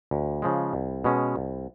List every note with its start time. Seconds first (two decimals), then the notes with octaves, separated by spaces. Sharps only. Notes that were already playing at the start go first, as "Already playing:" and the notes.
0.11 D2
0.42 C#3 F3 G#3
0.73 C2
1.04 B2 G#3 C#4
1.36 C2